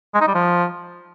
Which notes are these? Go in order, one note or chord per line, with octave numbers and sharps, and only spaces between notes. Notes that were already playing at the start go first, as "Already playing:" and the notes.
G#3
D#4
G3
F3